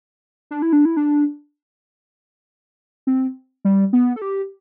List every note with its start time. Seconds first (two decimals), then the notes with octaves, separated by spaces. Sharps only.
0.51 D4
0.62 E4
0.73 D4
0.85 E4
0.97 D4
3.07 C4
3.65 G3
3.93 B3
4.16 A4
4.22 G4